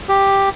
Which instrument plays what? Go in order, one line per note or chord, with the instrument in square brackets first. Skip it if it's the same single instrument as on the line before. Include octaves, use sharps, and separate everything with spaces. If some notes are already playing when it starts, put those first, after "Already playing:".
[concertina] G4